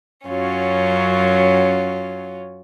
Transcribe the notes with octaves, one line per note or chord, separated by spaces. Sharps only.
F#2 F#3 C#4 F4